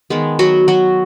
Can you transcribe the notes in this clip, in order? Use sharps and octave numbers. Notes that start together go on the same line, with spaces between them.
D#3 G#3 B3
F#3 F#4
F#3 F#4